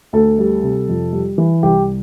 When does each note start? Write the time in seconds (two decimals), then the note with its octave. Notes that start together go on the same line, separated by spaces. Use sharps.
0.13 D2 A4
0.39 G3
0.63 C3
0.89 F2
1.13 G3
1.38 E3
1.63 C2 G4